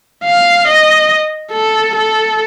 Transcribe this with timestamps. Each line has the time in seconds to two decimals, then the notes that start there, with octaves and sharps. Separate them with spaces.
0.24 F5
0.68 D#5
1.52 A4
1.95 A4